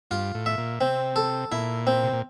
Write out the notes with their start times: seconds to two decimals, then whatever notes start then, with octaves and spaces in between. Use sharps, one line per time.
0.11 G2 F4
0.34 A2
0.46 E5
0.58 A#2
0.81 C3 C4
1.16 A4
1.52 A#2 E4
1.87 C4
2.03 C3
2.13 A#2